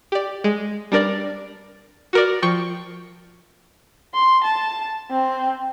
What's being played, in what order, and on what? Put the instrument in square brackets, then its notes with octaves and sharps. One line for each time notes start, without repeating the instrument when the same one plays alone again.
[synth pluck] G4 D5
G#3
G3 D4 A#4 D5
F#4 A#4 D5
F3 G5 C#6
[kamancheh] C6
A5
C4